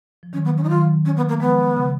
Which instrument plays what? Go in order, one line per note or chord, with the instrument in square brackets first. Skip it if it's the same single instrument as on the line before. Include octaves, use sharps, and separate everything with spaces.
[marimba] F3
[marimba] D#3 F#3 [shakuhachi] C#4
[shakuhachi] B3
C#4
D#4
[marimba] D#3 F#3 [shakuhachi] F4
[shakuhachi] C#4
B3
A#3
[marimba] F3 G#3 [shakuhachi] B3
[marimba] C#3